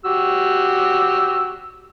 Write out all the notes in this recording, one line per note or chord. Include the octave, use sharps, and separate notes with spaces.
F#4 G4 E6